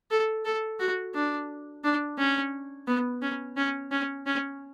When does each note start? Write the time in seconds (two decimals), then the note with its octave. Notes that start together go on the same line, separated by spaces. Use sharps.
0.11 A4
0.45 A4
0.79 F#4
1.14 D4
1.84 D4
2.18 C#4
2.87 B3
3.22 C#4
3.57 C#4
3.92 C#4
4.26 C#4